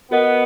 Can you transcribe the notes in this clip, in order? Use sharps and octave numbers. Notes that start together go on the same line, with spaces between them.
B3 F#4 A#4 D#5 F#5